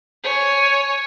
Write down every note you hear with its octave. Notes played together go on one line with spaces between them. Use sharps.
C#5 G#5